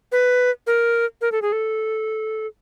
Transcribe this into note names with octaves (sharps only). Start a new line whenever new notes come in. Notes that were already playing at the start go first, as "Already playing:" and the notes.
B4
A#4
A#4
A4
G#4
A4